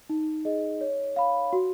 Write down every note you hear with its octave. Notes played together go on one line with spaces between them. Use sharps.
D#4
G#4 D#5
C#5
F5 B5
F#4